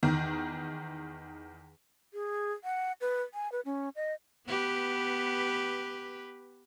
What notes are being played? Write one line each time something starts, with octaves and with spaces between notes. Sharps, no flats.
E2 D#3
G#4
F#5
B4
G#5
B4
C#4
D#5
B3 G4 B4